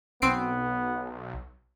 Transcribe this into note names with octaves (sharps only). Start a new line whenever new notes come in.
B1 B3 C4 C7 D7